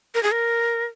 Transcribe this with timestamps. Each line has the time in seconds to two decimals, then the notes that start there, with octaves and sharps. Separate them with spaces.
0.15 A#4
0.23 G#4
0.32 A#4